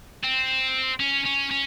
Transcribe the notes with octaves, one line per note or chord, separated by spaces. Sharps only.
C4
C#4
C#4
C#4